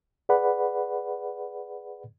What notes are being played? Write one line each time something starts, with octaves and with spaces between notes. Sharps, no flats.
G#4 B4 D5 F#5 B5